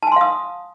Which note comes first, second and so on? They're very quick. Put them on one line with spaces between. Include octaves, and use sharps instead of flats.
A5 G#5 C6 F5 D#6